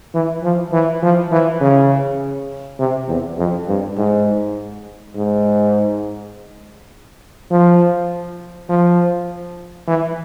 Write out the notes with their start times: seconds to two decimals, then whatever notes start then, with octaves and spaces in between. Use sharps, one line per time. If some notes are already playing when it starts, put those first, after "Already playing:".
0.14 E3
0.44 F3
0.73 E3
1.03 F3
1.32 E3
1.61 C#3
2.79 C3
3.09 E2
3.38 F2
3.68 G2
3.97 G#2
5.16 G#2
7.51 F3
8.69 F3
9.87 E3